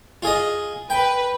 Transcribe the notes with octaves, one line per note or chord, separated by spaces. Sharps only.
F4 G#4 D#5
B4 G5